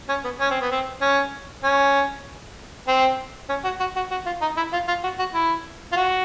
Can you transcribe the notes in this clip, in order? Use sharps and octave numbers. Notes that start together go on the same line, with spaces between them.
C#4
B3
C#4
C4
B3
C4
C#4
C#4
C4
C#4
F#4
F#4
F#4
F#4
F4
D#4
E4
F4
F4
F#4
F#4
E4
F4
F#4